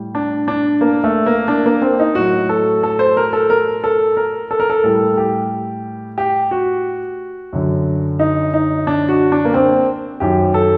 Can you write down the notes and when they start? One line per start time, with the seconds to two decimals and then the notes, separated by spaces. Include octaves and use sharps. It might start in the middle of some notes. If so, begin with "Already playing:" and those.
Already playing: A2 G3
0.15 D4
0.48 D4
0.81 A#3
1.04 A3
1.26 A#3
1.48 D4
1.66 A#3
1.82 C4
2.00 D#4
2.15 A2 F#3 F#4
2.49 A4
2.83 A4
2.99 C5
3.17 A#4
3.33 A4
3.50 A#4
3.84 A4
4.17 A#4
4.51 A4
4.60 A#4
4.70 A4
4.84 A2 G3 A4
5.17 G4
6.18 G4
6.51 F#4
7.53 F#2 D3 F#3
8.19 D#4
8.54 D#4
8.87 D4
9.09 F#4
9.32 D4
9.45 A#3
9.54 C4
10.20 F#2 D#3 F#3 G4
10.54 A4